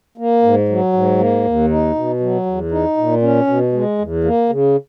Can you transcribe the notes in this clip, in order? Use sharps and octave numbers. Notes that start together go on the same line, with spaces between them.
A#3
G#2
F#3
G#2
A#3
D#2
D#4
B2
F#3
E2
D#4
A#2
C#4
B2
G#3
E2
A#3
C#3